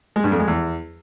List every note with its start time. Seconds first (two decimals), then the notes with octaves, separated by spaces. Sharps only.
0.16 G#3
0.24 G2
0.32 F2
0.40 G#3
0.48 E2